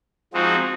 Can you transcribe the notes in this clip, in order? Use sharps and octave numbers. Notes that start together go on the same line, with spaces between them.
F3 G#3 C4 D#4 F#4